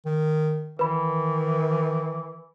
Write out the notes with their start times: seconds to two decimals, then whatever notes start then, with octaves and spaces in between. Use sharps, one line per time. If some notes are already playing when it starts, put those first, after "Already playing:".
0.05 D#3
0.79 D#3 E3 B4 B5